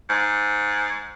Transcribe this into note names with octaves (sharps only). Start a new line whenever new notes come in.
G#2